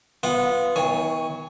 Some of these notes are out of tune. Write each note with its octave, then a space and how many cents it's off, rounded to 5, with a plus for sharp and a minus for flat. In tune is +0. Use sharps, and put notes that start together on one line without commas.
B3 +0 F4 -15 F#5 -25
D#3 +45 C#5 +0 G#5 +0